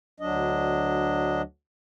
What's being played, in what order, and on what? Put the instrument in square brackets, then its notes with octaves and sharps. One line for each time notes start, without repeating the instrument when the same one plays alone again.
[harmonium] D2 F#3 D4 D#5